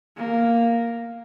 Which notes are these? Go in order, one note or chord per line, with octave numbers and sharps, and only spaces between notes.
A#3